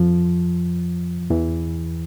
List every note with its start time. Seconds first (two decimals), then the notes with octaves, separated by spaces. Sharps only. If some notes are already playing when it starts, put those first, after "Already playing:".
Already playing: F2 F3
1.30 E2 E3